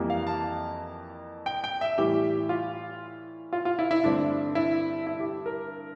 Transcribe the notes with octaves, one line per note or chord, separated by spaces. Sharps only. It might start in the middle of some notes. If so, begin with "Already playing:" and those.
Already playing: F2 E3 G3 A#3
F5
A5
G5
G5
E5
A2 E3 G3 G4
F4
F4
F4
E4
E4
G2 D3 A3 C4 D4
E4
E4
G4
A#4